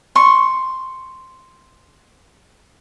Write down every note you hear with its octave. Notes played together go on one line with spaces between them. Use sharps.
C6 C#6